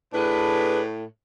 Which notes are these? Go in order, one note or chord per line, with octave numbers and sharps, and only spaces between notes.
A2 D4 G#4 B4